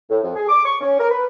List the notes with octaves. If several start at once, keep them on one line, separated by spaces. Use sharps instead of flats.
A2
F2
G#4
D6
C#6
C#4
A#4
B4